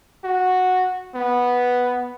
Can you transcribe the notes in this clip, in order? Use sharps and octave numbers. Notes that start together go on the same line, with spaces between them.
F#4
B3